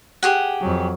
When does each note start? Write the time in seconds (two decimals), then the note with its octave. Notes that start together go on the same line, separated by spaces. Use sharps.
0.23 G4 G#4 F#5
0.61 F2 F#3